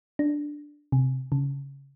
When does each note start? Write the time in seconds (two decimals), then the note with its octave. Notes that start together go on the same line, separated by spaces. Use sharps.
0.19 D4
0.92 C3
1.32 C#3